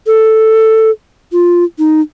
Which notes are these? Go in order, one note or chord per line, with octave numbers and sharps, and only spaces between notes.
A4
F4
D#4